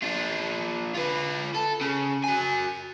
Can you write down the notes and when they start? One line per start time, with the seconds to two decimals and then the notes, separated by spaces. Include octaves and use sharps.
0.02 D4 F4
0.94 F4 B4
1.54 A4
1.81 C#3
2.24 F#4 G#5